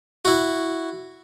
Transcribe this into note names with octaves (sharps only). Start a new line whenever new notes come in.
E4 F#4